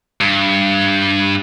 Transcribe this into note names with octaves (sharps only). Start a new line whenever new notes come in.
G2